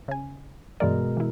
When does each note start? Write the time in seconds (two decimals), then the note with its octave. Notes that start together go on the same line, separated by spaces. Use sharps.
0.08 C#3 G#5
0.80 G2 B2 E3 G#3 A#4 D5
1.17 E3 E4